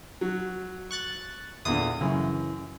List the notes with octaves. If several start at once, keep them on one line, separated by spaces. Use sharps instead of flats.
F#3
C#6 F#6 A6
E2 A#2 D3 D#6
F#2 C#3 E3